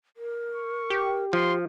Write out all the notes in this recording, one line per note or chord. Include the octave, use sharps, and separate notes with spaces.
A#4
C#6
G4
F3 F5 C6